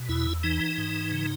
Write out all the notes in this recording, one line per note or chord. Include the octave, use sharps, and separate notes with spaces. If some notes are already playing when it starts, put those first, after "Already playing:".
Already playing: B2
E2 E4
E3 D#4
G#2
C#3